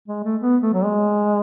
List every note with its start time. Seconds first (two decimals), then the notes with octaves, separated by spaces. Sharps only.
0.08 G#3
0.24 A3
0.41 B3
0.62 A3
0.74 F#3
0.84 G#3